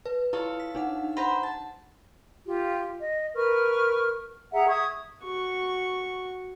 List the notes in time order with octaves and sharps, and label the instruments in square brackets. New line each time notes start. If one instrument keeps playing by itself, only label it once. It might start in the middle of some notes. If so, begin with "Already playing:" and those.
[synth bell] B4
[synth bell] E4 [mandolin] F4 A4 C#5
[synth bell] B6
D4 D#4 F#5
[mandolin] B4 C5 A#5 [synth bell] F#5
[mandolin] A5
[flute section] F4 G4
D#5
A#4 B4 C#6 F6
G#4 E5 F#5 A#5
E5 C#6 D#6 G#6
[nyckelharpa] F#4 C#6